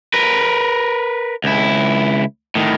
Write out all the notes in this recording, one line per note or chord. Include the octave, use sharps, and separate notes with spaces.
A#4 B4
C#2 E4
A2 D#3